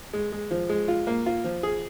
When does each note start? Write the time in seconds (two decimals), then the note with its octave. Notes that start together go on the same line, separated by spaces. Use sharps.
0.13 G#3
0.32 G#3
0.51 F3
0.69 G#3
0.88 F4
1.07 A#3
1.26 F4
1.44 F3
1.63 G#4